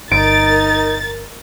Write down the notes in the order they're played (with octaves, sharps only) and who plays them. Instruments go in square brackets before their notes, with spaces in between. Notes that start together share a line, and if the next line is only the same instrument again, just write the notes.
[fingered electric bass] G1 [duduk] D#4 [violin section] A#4 A6 [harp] D7